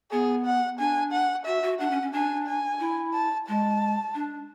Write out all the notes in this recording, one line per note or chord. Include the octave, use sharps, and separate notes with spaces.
B3 G#4
F#5
D4 G#5
F#5
F#4 E5
F#4
D4 F#5
C#4
C#4
D4 G#5
G#5
E4
A5
G#3 A5
D4